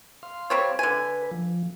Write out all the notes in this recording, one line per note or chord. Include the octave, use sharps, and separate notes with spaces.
F5 C6
G3 C4 C#5
D3 B4 G#5
F3